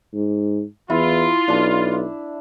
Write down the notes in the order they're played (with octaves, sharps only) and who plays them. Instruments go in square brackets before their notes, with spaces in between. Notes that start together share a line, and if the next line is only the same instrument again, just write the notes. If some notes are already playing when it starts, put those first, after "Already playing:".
[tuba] G#2
[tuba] E2 [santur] E4 [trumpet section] F4
[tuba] B1 [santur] D4 A5